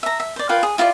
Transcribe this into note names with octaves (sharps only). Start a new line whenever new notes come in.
E5 A#5
E5
C5 D5
F4 A#4 B4 G5
G#4
E4 F4 G4 D5